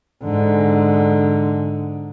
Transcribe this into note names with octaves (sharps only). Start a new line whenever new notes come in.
G#2 D3